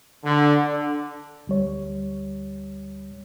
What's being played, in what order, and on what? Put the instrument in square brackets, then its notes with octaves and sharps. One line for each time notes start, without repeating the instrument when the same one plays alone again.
[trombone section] D3
D3
[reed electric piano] D2 G3 C#5